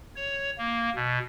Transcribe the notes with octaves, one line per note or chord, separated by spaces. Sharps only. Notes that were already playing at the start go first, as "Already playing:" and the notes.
C#5
A#3
B2